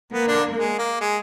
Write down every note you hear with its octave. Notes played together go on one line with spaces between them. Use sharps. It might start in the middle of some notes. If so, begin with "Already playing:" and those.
A#3 B3
D3 D4
G#3
A#3
G#3